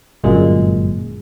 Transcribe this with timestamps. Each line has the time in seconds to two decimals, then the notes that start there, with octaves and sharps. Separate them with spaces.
0.24 G1 F#2 A#2 G#3